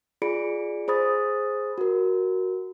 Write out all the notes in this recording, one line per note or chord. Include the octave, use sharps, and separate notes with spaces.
F4 G#4 D5 B5 C#7 D7
G#4 C5 B5 D#6 A6
F#4 A#4